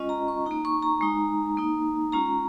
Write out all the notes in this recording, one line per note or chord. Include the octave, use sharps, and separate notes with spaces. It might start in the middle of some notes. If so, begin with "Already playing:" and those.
Already playing: G#3 C#4 F4 D#5
A#5
C#6
A#3 D#4 A#5
C#6
A#5
G#3 D#4
A#3 D#4
G#3 C#4 F4 A#5